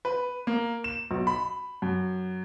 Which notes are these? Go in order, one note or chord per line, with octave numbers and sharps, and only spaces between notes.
B4
A#3
E7
B1
B5
F#2